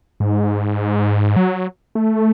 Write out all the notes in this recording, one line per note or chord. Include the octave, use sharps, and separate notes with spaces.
G#2
F#3
A3